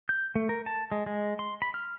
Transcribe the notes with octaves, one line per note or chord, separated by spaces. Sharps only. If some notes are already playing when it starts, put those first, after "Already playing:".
G6
A3
A#4
A5
G#3
G#3
C6
B5
F6